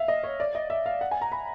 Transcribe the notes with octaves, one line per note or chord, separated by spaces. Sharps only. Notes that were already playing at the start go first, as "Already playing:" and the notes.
Already playing: E5 F5
D#5
C#5
D5
D#5
E5
F5
F#5
G#5
A#5
B5